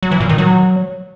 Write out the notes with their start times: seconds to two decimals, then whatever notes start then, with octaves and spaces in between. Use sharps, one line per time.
0.03 F#3
0.11 E3
0.20 A#2
0.29 D#3
0.38 F#3